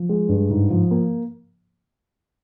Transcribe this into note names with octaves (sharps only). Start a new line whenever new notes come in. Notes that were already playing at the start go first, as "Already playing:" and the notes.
Already playing: F3
G#3
G2
G#2
F3
A#3